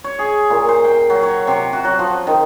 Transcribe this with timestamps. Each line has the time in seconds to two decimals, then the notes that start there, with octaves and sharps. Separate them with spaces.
0.04 C#5
0.19 G#4
0.50 A#2
0.69 C5
0.84 G5
1.10 F#3
1.23 C#5
1.47 C3
1.73 F#4
1.85 F#3
1.99 F3
2.27 D#3